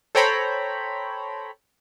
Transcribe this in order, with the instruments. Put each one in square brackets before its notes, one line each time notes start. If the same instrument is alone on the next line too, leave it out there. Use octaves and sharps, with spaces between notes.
[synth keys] A4 C5 C#5 G5 A#5 B5